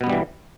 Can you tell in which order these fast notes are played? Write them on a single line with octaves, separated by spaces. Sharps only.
B2 B3 G2 G3 E3